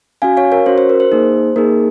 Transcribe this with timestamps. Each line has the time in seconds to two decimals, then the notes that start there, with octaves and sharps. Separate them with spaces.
0.22 C#4 F#4 F5 G#5
0.37 C#5 F5
0.52 A#4 C#5
0.66 C#4 F#4 C5
0.78 C5
0.89 A#4
1.00 C5
1.12 A#3 D#4 G#4
1.56 A#3 D#4 G#4 A#4